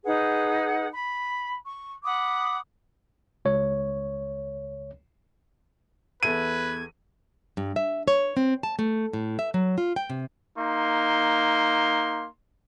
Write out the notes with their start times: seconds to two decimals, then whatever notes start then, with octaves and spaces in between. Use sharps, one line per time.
0.04 D#4 G#4 B4 F#5
0.90 B5
1.63 C#6
2.03 F#5 B5 D6 D#6
3.45 C#2 C#5
6.23 E2 A4 B4 E5 G#6 D#7
7.57 G2
7.76 E5
8.08 C#5
8.37 C4
8.63 A5
8.79 A3
9.13 A2
9.39 E5
9.54 F#3
9.78 F4
9.96 G5
10.10 C3
10.59 A#3 D#4 C6